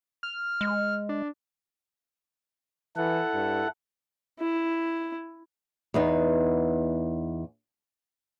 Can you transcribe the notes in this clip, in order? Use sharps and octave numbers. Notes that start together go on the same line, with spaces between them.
F6
G#3
D4
E3 E4 A4 F#5
G2
E4
E2 B3 D#4